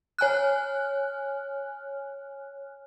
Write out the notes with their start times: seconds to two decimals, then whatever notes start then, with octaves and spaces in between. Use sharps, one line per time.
0.19 C#5 G#5 F6 F#6